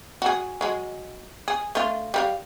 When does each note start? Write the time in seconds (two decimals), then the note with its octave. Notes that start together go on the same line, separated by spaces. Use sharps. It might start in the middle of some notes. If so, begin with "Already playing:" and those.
0.22 F#4 G#4
0.61 F#3 G#3
1.48 G#4
1.75 A3 D4 F4
2.14 G3 A#4 F5